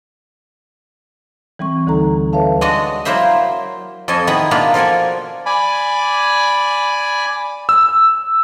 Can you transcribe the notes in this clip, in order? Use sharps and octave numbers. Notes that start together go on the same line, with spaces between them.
E3 G3 C4 C#6
D2 D3 D#4 A4 A#5
A4 B4 C#5 E5 F5 A5
G#3 D4 F#4 D#5
F#3 A#3 E4 C5 E5
F2 A4 D#5 G#5
D#3 B3 E4 G#4
B2 A#3 D4 F4 B5
F3 A4 A#4 D5 G#5
D5 G#5 B5
E6